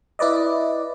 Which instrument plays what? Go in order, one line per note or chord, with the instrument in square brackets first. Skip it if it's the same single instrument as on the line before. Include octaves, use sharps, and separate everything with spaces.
[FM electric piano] E4 B4 D5 D#5